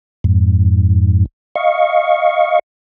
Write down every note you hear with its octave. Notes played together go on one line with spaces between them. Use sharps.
F2 G#2
D#5 F5 C#6